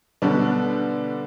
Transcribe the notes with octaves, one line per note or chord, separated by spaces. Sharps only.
B2 D3 G3 D4